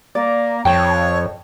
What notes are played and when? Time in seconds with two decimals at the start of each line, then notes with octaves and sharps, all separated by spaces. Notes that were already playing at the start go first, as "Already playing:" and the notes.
0.15 A#3 D5
0.65 F2 C#5 G5 A5